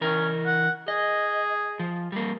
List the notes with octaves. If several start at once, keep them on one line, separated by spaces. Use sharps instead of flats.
E3 C#4 A#4
F#5
G#4 D#5
F3
G3 A#3